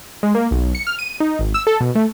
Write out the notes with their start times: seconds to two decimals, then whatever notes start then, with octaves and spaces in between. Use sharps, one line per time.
0.23 G#3
0.35 A#3
0.51 B1
0.75 C#7
0.87 F6
0.99 D#7
1.20 D#4
1.39 G#1
1.54 E6
1.67 A4
1.80 B2
1.95 A3